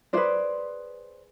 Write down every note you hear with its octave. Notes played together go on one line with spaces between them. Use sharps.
D4 F4 G#4 B4 C5 D5